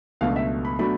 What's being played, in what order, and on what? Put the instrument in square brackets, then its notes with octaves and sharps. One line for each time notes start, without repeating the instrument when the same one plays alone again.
[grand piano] C#2 B2 F#3 A3 D4 F5
E5
B5
B2 F#3 A3 D4 B5